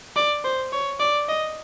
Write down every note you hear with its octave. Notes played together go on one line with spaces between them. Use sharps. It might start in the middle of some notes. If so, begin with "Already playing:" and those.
D5
C5
C#5
D5
D#5